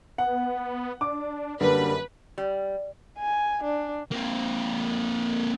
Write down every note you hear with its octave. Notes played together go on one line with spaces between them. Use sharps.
B3 F#5
D4 D6
F#2 D3 G3 A#3 B4
G3
G#5
D4
A#3 C4